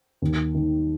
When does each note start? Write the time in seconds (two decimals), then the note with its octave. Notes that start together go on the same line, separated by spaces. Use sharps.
0.22 D#2
0.55 D#3